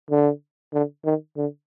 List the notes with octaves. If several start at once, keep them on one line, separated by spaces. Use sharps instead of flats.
D3
D3
D#3
D3